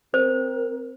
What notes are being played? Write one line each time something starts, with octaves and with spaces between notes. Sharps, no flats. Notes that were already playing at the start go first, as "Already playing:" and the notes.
C4 A#4 C5